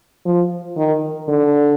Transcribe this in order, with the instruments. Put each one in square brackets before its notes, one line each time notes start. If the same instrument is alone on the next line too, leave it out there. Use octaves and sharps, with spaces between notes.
[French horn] F3
D#3
D3